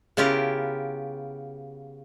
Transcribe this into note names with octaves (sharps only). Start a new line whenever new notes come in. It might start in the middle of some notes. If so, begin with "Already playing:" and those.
C#3 B3 E4 F4 G4 A#4